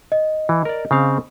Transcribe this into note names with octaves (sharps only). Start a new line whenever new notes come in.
D#5
E3
A#4 D5
C#3 C4 F5